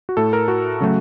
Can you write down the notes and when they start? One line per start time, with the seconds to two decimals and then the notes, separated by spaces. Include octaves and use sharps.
0.09 F#4
0.17 A2 A3 A4
0.33 A#4
0.48 F#4
0.80 C#3 F#3 A3